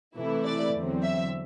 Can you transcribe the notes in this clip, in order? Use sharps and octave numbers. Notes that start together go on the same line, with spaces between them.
C3 E3 A3 E4
D5
E2 D3 F#3 C4
E5